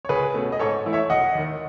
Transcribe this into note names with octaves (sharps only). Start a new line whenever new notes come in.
C#5
C#2 G#4 B4
B2 A3 C#4
D#5
G#2 A4 C#5
E3 A3 E4
C#5 E5
E1 D#5 F#5
D#2 D#3